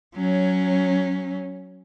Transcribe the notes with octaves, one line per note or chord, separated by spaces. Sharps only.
F#3 C#4